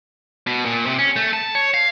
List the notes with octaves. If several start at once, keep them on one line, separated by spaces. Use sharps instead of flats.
B2
A#2
C3
C#4
A3
A5
C#5
F5